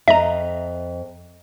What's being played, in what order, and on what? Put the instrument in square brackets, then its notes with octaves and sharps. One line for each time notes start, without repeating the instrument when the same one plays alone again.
[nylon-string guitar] F2 D#5 [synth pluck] E5 A#5